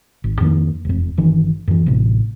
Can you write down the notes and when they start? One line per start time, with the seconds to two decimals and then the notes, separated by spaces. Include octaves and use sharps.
0.24 G#1
0.41 F2 D#3 A#3
0.85 E1 F2
1.18 G1 D#3 E3
1.68 F#2 E3
1.86 A1 C3